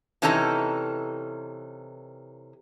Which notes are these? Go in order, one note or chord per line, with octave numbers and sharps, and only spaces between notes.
C3 E3 C#4 D#4 A4 A#5